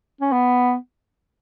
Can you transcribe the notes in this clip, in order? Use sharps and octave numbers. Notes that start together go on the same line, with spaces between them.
C#4
B3